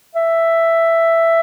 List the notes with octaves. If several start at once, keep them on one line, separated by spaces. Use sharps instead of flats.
E5